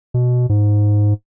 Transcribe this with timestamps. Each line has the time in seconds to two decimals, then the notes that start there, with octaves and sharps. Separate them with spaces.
0.14 B2
0.49 G#2